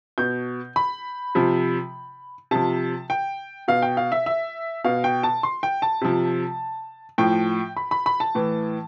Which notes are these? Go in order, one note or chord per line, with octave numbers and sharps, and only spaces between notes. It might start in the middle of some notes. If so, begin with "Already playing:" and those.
B2 G6
B5
C3 F3
C3 F3 A5
G5
B2 F5
G5
F5
E5
E5
B2 F5
G5
A5
C6
G5
A5
C3 F3
A2 F3 G5
B5
B5
B5
A5
A2 E3